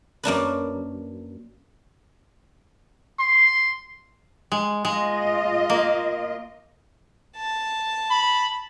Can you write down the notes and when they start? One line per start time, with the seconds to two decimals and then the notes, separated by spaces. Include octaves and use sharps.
0.23 F#2 A#3 D4 B4
3.20 C6
4.52 G#3
4.85 G#3 F4 D#5
5.70 A#3
7.37 A5
8.11 B5